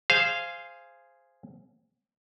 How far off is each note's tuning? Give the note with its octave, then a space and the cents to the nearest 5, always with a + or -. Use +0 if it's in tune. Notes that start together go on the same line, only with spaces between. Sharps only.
G#4 +0 C5 +0 F5 -15